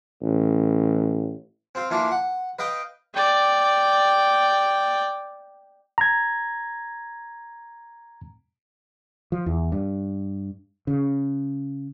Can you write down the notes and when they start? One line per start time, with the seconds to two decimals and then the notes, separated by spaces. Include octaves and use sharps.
0.22 A1
1.75 C4 F4
1.90 E3 A#3 D4 F4
2.11 F#5
2.59 B4 D#5 F5 G5
3.14 D5 G5
5.98 A#5 G#6
9.32 F3
9.46 E2
9.72 G2
10.87 C#3